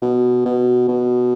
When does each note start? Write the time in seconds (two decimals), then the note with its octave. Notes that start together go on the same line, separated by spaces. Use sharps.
0.02 B2
0.45 B2
0.88 B2